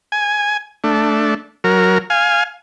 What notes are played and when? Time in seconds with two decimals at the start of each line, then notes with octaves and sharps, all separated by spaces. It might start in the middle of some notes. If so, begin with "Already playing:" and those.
0.12 G#5
0.84 A3 D4
1.64 F#3 A#4
2.10 F5 G#5